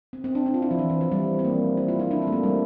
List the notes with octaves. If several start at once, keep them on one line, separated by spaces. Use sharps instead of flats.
C4
C4
D4
D4
F4
E4
F3
E3
E3
F3
G3
C4
A#3
E4
F4
E4
D4
C4
A3
A#3
G3